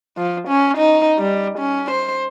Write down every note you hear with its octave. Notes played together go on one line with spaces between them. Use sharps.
F3
C#4
D#4
G3
C#4
C5